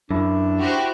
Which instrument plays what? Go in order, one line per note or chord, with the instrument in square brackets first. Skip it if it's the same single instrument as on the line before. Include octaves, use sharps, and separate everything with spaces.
[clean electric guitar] F#2 [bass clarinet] D4 [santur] E4
[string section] F#4 G4 C5